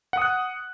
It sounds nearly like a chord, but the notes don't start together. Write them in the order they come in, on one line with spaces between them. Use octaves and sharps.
F#5 D#6 F#6